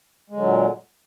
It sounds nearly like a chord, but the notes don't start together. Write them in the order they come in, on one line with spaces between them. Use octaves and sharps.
G#3 D3 F#3 A#2